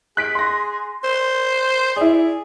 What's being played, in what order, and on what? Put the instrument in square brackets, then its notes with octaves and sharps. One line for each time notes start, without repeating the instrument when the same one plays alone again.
[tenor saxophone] G#4 [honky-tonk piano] F#6 B6 D7
[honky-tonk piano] C6 A#6
[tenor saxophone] C5
[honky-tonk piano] E4 D5 [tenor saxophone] G#4